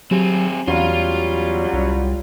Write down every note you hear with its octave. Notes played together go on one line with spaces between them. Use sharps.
F#3 C4 G4 G#4
E2 F#3 G3 C#4 F4 F5
C2